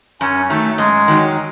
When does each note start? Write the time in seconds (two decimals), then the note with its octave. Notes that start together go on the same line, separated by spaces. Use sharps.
0.21 F#2 C#4
0.50 D#3 F#3 A3
0.78 F#2 G#3
1.08 D#3 F#3